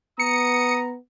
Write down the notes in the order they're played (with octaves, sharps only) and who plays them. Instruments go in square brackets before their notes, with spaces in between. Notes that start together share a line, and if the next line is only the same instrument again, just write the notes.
[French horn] B3 [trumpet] A#5 [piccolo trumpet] D#6 [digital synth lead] C#7